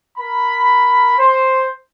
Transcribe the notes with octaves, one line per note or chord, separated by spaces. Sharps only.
A#4 B5
C5